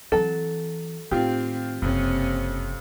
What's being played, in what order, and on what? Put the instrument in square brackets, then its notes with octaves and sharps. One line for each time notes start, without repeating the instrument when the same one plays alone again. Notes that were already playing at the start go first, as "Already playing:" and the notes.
[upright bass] E3 C4 [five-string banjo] F#3 A4
[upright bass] A2 D#3 [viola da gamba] C4 [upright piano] F4 G4
[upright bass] F#1 A#3 [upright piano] F2 [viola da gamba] C3 C#4